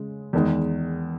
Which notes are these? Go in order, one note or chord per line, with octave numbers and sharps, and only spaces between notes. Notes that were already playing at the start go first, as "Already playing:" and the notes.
Already playing: C#3 G#3
E2 D#3 G#3 D#4